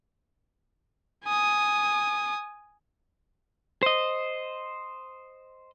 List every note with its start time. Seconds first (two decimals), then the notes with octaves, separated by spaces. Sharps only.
1.25 G#5 D#6
3.83 C5 D#5